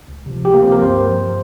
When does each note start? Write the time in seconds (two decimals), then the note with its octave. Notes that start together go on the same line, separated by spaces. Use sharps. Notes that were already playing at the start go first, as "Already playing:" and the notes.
0.08 C#2
0.26 C3 F3
0.44 C#2 G4
0.54 A#3
0.63 C3 F3 C4
0.72 A#4
0.81 G2 C5
1.00 F3